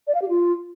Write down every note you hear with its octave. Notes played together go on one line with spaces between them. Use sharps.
D5
F5
G4
F4